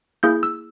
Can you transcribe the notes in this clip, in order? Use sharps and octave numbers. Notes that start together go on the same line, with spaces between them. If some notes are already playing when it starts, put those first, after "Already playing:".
A#3 E4 G#4 G6
E6